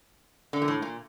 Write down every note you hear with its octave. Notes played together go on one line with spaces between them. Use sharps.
D3
A#2
A2
A#2